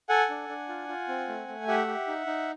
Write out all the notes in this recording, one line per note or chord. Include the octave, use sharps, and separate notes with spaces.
A4 F#5 G#5
D4
D4
F4
F4
C4
A3
A3
G4 E5 F#5
G4
D#4
D#4